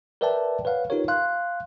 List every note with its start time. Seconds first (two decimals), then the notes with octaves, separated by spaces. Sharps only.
0.21 A#4 B4 D5 E5 G5 A5
0.65 B4 C#5 F5 F#5
0.90 D#4 F4 G4 A#4 C#5
1.08 F5 C6 F#6